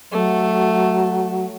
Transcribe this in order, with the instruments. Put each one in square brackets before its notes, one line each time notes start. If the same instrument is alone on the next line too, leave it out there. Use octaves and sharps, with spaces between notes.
[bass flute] F#3 [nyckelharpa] A3